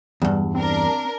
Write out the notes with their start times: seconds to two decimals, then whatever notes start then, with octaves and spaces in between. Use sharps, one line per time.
0.22 E2 G2 G3
0.55 C4 D4 A#4